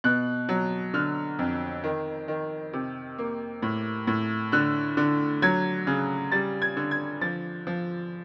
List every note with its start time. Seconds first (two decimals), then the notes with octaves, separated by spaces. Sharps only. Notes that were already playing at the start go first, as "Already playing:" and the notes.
0.04 B2 F#6
0.49 F#3
0.94 D3 F6
1.39 F2
1.84 D#3
2.28 D#3
2.73 C3
3.18 A#3
3.62 A2
4.07 A2
4.52 D3 F#6
4.97 D3
5.42 F#3 G#6
5.87 C#3
6.32 G3 A6
6.62 G#6
6.77 D3
6.91 G#6
7.21 F3 A6
7.67 F3